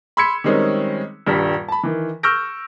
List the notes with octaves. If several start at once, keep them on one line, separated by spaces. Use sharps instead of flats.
B5 C6 E6 G#6 B6 C#7
D#3 G3 G#3 C4 C#4 D#4
D#1 G2 G3 B6
A5 B5
D#3 E3
C#6 E6 F6 G6 A#6 D7